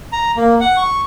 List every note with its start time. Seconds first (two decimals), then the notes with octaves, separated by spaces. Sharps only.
0.12 A#5
0.37 A#3
0.60 F#5
0.77 C#6